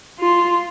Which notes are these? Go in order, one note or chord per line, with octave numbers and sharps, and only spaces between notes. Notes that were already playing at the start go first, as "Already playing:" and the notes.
F4